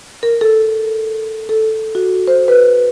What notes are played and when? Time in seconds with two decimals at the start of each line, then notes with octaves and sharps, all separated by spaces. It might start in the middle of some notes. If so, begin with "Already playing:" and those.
0.23 A#4
0.41 A4
1.49 A4
1.95 F#4
2.28 C5
2.48 B4